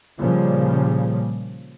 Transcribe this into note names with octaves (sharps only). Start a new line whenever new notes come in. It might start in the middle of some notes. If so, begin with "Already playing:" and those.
A#2 C#3 F3 G3